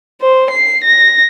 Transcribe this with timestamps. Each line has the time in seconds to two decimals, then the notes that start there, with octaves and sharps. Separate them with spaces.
0.21 C5
0.50 C7
0.84 A#6